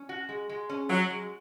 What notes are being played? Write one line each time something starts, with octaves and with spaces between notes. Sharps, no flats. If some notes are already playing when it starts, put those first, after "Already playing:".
Already playing: C#4
F#4
G#3
G#3
C#4
F#3 F#4
G#3